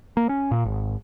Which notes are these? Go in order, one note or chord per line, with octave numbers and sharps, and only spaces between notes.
A#3
C#4
A#2
G#1